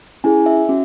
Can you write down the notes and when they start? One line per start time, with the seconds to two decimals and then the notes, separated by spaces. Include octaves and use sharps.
0.24 C#4 E4 G#4 G#5
0.46 E5
0.69 C#4 F#4